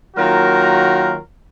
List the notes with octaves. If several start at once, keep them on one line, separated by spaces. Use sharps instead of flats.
D#3 F#3 A#3 F4 F#4 A#4